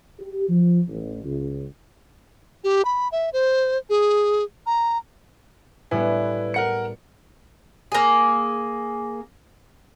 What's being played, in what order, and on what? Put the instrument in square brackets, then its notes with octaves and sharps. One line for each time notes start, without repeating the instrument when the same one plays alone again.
[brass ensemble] G4
F3
A1
C#2
[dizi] G4
B5
E5
C5
G#4
A#5
[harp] A2 G3 B3 [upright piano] E4 B4 G#5
[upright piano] A#4 F#5 C#7
[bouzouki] A#3 G#4